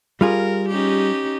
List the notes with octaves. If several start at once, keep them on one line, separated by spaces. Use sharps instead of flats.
G3 F4 G#4 A#4
C#4 D#4 G4